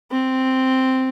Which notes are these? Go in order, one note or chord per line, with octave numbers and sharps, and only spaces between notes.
C4